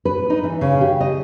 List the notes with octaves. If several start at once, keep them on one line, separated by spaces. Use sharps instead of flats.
B4
D#4
E3
C#3
G4
D#5